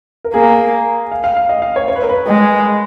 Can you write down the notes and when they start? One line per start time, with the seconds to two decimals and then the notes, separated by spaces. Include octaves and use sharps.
0.24 A#4
0.34 A#3 G#4
1.12 F5
1.24 F5
1.37 F5
1.49 D#5
1.62 F5
1.76 C#5
1.88 C#5
1.96 B4
2.03 A#4
2.09 B4
2.27 G#3